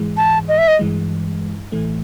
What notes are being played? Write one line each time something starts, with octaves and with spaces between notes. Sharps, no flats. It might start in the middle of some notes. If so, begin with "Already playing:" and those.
Already playing: G#2 E3 G#3
A5
D#5
E5
D#5
G2 E3 G#3
A1 A2 E3 A3